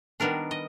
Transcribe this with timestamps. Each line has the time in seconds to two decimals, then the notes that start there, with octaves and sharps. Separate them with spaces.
0.20 D#3 G3 B3 D4 A#4
0.51 D#5